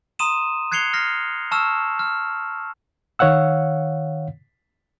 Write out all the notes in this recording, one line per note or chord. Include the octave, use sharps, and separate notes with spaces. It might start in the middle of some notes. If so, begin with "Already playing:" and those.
A#5 C6 D#6 D#7 E7
F#6 G#6 C7 C#7 F7 G7
F6 A#6 C7
A5 C#6 E6 F6 E7
F6
D#3 C#5 F5 F#5 E6